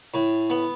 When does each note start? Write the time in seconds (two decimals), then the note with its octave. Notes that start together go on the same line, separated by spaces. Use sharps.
0.14 A2
0.50 B3